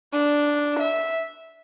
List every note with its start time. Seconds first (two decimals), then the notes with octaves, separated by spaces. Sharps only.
0.13 D4
0.80 E5